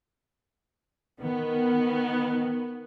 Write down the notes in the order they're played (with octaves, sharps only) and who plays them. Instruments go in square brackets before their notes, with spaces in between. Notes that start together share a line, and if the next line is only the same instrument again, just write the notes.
[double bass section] D#3 [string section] B3